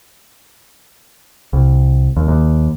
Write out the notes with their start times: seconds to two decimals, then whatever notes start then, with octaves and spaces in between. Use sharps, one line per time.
1.53 C2
2.17 D#2
2.28 D#2